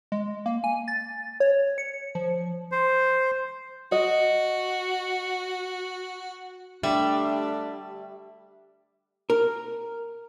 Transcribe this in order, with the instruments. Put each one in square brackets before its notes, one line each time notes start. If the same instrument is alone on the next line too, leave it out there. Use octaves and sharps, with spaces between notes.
[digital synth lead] G#3
A#3
G#5
A6
C#5
C#7
F3
[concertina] C5
[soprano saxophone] F#4 [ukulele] D#5
[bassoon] D3 [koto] G3 [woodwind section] A3 D4 [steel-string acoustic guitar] E5
[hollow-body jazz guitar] A#4